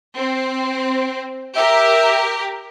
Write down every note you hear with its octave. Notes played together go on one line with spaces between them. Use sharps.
C4
G4 A#4 E5